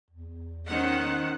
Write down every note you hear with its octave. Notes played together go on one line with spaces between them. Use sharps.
E2
D#3 C#4 D#4 C5 F#5